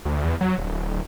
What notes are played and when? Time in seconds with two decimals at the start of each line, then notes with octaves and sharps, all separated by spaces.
0.05 D2
0.25 E2
0.41 F#3
0.58 D1